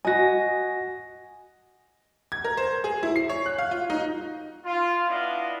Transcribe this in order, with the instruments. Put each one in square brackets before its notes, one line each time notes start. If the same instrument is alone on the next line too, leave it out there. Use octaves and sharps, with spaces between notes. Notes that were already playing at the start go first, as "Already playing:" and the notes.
[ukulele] F#4 D#5 [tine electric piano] G#5 A#6
[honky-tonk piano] G#6
A#4
C5
G#4
E4
C7
C#5
F#6
F5
F4
D#4
[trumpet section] F4
B3 D4 E4 D#5 F5